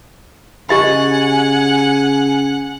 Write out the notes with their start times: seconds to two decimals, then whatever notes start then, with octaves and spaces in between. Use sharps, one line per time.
0.69 C#3 G4 D#5 F#5 G#5 B5